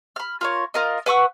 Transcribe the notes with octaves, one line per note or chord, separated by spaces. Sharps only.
B5 F6
F4 A#4 C#5
F4 A#4 D#5
B4 F#5 C#6 E6